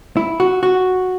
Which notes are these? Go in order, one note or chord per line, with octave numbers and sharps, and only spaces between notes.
E4
F#4
F#4